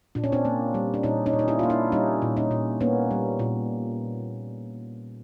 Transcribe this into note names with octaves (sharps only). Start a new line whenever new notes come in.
A#2 D4
C#4
C4 D4
A#3
G3
D4
A#2 C#4 D#4
C#4 D#4
A#2
D#4
D4 E4
A#3 F4
D4 E4
G3 C#4 D#4
A#2
C#4 D#4
A#2
A#3 B3 C#4
G3
A#2